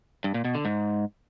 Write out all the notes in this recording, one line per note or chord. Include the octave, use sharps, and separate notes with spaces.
G2
A#2
B2
D3
G#2